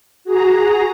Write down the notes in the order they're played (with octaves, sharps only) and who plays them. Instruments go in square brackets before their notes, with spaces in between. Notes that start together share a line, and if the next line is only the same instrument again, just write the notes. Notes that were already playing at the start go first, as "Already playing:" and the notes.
[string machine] F#4 G#4 A#5